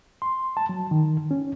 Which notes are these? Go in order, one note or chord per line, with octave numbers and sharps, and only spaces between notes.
C6
A5
F#3
D#3
C#4